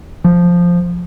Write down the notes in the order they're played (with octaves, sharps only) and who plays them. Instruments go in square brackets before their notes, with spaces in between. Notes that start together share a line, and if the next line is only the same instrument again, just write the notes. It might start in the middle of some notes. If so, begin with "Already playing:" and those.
[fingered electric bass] F3